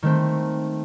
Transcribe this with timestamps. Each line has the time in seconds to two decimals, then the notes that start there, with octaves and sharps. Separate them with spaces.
0.03 D#3 A3 C4